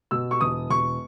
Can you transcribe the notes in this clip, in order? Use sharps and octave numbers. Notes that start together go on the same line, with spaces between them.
B2 E6
C#6
E1 D#6
E1 C#6